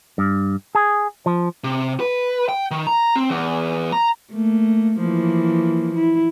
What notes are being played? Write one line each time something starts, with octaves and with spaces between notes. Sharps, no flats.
G2
G#4
F3
C3
B4
G5
D#3
A#5
C4
E2
A#5
A3 A#3
E3 F3 A#3
E4